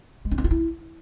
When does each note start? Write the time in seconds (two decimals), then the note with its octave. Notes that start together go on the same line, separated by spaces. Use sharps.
0.25 G#3
0.31 C#4
0.38 C4
0.44 F4
0.51 E4